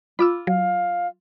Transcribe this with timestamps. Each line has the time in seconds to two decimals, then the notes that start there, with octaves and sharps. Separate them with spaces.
0.19 F4 B5 D6 E6
0.47 F#3 F5